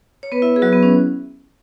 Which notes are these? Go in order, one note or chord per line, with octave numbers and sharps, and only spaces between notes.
C#5
B3 B4
E4 E5
G#4
F#3 F#4
B3
C#4